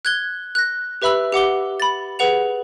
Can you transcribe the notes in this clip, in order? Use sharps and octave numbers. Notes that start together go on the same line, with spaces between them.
F#6 G#6 G7
F#6 A#6
G4 B4 E5 B5 E6 F#7
G4 F#5 D6 G7
B5 A6
G#4 B4 F#5 F7